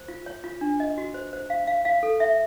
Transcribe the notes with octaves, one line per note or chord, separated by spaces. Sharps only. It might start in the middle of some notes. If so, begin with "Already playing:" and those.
Already playing: C5
F4
C#5
F4
D4
D#5
F#4
C5
C5
F5
F5
F5
A4
E5